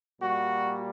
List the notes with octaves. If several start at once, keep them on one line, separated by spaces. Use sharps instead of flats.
A#2 G3 A#3 F#4